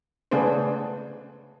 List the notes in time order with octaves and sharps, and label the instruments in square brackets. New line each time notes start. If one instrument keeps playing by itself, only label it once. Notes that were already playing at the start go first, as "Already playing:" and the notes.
[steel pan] C#3 A3 B3 D4 G#4 C5